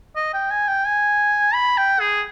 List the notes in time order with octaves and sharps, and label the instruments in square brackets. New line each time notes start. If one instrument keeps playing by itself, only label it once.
[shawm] D#5
G5
G#5
G5
G#5
B5
G5
G#4